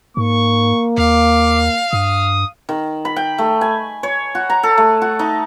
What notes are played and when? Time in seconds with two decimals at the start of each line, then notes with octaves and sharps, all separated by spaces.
0.17 G#2 A#3 C#6
0.98 D#2 F5 D6
1.93 G2 D#6
2.69 D#3
3.05 B5
3.16 G5
3.38 A3
3.61 G#5
4.03 C#5
4.35 F#4
4.50 A#5
4.63 A4
4.78 A3
5.02 F#4
5.19 D#4